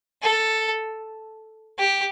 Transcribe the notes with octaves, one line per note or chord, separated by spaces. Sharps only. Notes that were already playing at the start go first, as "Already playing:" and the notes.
A4
G4